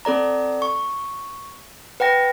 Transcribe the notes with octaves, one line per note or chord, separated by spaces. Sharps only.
C4 A4 D5 A#5
C#6
B4 F#5 G5 A#6